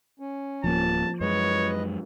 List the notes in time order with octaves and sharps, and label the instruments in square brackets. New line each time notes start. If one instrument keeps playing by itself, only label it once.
[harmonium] C#4
[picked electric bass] D1 A#3 [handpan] F3 [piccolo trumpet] A5
[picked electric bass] F#2 G#3 [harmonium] B4 D#5 [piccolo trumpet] C#5